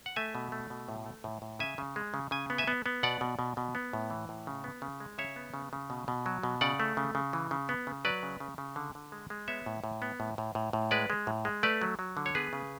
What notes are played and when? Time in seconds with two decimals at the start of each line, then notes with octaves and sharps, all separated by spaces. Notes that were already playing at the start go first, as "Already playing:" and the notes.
0.06 F#5
0.16 A3 E5 G#5
0.35 B2
0.52 A3
0.70 B2
0.89 A2
1.06 A3
1.24 A2
1.42 A2
1.59 C#3 E5 G#5
1.78 C#3
1.96 G#3
2.14 C#3
2.31 C#3 G#5
2.50 B3
2.58 E5 G#5
2.68 B3
2.86 B3
3.03 B2 D5 F#5
3.21 B2
3.39 B2
3.57 B2
3.75 B3
3.93 A2
4.10 E3
4.29 A2
4.47 C#3
4.64 B3
4.82 C#3
5.00 G#3
5.18 C#3 C#5 E5
5.36 B3
5.54 C#3
5.73 C#3
5.90 B2
6.08 B2
6.26 F#3
6.43 B2
6.61 C#3 D5 F#5
6.80 A3
6.97 C#3
7.15 C#3
7.33 E3
7.51 C#3
7.69 B3
7.87 C#3
8.05 F#3 B4 D5
8.23 C#3
8.40 C#3
8.58 C#3
8.76 D3
8.95 D3
9.12 G#3
9.30 G#3
9.48 B3 C#5 E5
9.66 A2
9.84 A2
10.02 B3
10.20 A2
10.38 A2
10.55 A2
10.73 A2
10.91 G#3 B4 D5
11.10 G#3
11.27 A2
11.45 G#3
11.63 A3 B4 D5
11.81 F#3
11.99 F#3
12.17 D3
12.26 C#5
12.35 B3 G#4 B4
12.53 C#3